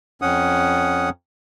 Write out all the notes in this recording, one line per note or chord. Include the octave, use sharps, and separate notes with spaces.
F2 C#4 F#5 D#6